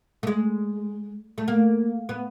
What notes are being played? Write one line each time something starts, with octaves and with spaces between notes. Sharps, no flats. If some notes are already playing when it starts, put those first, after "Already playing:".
A3
G#3
A3
A#3
B3